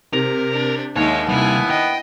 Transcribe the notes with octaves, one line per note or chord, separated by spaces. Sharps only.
C3 A#4
D4
D#2 G#3 C#5 E5
C3 G3 B3 E4 G#5
D#5 G5